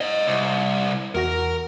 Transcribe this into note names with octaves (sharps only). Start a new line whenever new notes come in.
C5 D#5
C2
E2 F#4 A#4 A#6